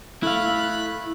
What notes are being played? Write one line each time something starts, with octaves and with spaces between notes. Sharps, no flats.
A3 E4 F5 B5 F#6